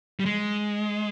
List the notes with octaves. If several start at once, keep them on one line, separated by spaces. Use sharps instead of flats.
G3
G#3